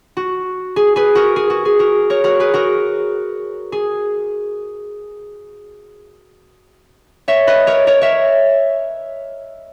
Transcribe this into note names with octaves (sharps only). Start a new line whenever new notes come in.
F#4
G#4
G#4 B4
F#4 A#4
G#4
F#4
G#4
F#4 A#4
A#4 C#5
F#4 A#4
G#4 B4
F#4 A#4
G#4
C#5 E5
B4 D#5
A#4 C#5
A#4 C#5
C#5 E5